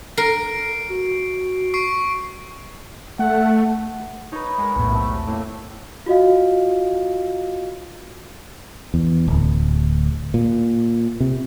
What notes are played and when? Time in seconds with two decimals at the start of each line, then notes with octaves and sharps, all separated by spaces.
0.17 A#4 C7 D7
0.89 F#4
1.74 C#6 C7 D7
3.19 A3 F#5
4.32 D#4 B4 C#5
4.58 G#3 A#4 F#5 G#5
4.76 B1 E2 A2 B3
4.91 A3 C4 G4
5.28 A2 A3 A#3 E5
6.06 F4 F#4 D#5 F5
8.94 E2
9.28 D1
10.34 A#2
11.20 C3